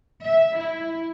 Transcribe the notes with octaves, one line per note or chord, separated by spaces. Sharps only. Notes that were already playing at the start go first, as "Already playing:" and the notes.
E5
E4